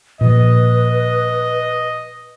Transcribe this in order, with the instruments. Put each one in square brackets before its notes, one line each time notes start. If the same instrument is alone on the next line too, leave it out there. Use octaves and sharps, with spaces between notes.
[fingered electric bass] A#2 F3 [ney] B4 [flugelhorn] D#5